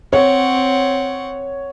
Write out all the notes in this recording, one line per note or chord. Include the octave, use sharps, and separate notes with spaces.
C4 C#5 F#5